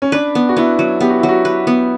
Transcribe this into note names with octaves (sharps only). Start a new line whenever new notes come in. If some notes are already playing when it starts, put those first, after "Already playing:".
C#4
D4 B4
B3
F#4
B3 E4
F#3
B3 G4
F#4
F#3 E4
F#4
B4
B3